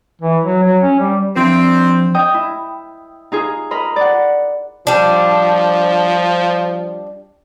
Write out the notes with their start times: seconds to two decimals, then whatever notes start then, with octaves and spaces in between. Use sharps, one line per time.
0.22 E3
0.44 F#3
0.63 F#3
0.82 C#4
1.00 G3
1.36 F3 C4 D4 F4
2.14 D#5 G5 D#6
2.34 E4
3.32 D#4 F4 G#4
3.71 A#4 D#5 B5 C6
3.96 D5 F#5
4.87 F3 G3 D4